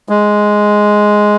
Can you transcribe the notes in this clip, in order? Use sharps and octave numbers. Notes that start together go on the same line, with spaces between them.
G#3